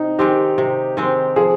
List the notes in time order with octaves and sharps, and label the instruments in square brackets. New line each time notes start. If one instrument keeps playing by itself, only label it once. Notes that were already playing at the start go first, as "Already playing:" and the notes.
Already playing: [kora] C3 [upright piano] D#4
[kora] D#3 G#3 C4 [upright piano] G4
[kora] C3
D#3 G#3 C4
[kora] F3 [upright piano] G#4